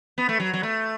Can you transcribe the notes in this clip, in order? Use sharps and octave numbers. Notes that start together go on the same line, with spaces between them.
B3
A3
F#3
F#3
A3